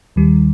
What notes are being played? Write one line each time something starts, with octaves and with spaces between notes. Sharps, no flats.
D#2 D#3 G3